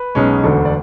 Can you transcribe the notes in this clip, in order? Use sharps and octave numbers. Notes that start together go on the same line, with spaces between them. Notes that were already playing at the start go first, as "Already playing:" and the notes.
Already playing: B4
B1 B2 G#3 C#4
E1 D2 D3 A4
D5